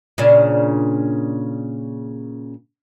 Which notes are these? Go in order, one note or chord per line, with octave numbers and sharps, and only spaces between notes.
A#2 C#3 D4